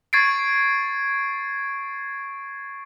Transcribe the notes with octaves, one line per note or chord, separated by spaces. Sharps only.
C#6 G#6 A6 C7 D7